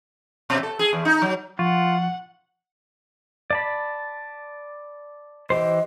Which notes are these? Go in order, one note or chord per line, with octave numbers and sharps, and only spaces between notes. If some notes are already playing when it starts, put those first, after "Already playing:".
B2
A4
G#4
E2
D#4
F#3
F3 F4 F#5 C#6 A6
D5 A5 B5
E3 G4 C5 D#5